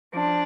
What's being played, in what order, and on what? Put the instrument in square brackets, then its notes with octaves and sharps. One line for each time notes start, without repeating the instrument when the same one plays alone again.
[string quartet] F3 D4